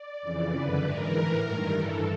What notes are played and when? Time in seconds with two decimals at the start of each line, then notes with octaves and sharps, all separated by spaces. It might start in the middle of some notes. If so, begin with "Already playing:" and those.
Already playing: D5
0.22 F2 C#3 E3
0.52 F#2 D3 B4
0.82 G#2 E3 A#4
1.12 A2 E3
1.43 G2 D#3 A#4
1.72 G2 E3 A4